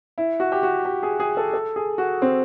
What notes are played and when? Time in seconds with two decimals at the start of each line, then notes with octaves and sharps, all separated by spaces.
0.18 E4
0.40 F#4
0.52 G4
0.63 F#4
0.85 G4
1.03 G#4
1.20 G#4
1.37 A4
1.53 A4
1.76 G#4
1.98 F#4
2.22 C4